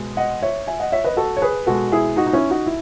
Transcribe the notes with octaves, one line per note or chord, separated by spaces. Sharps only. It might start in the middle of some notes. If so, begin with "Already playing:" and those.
Already playing: B2 G#3
D#5 F#5
C#5 E5
E5 G#5
D#5 F#5
C#5 E5
B4 D#5
F#4 A4
C#5
G#4 B4
B2 G#3 F#4 A4
E4 G#4
D#4 F#4
D#4
C#4 E4
D#4 F#4
E4